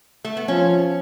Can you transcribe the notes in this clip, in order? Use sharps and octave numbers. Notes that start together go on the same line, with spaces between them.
A3
B3
F3 C#4